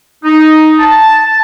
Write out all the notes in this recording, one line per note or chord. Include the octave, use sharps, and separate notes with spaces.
D#4
A5